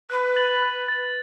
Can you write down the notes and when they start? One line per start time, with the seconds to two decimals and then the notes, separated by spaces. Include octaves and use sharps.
0.10 B4 F#6
0.36 A6 F#7
0.62 F#6
0.88 A6 F#7